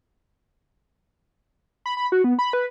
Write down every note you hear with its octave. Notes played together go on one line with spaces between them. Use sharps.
B5
B5
F#4
B3
B5
B4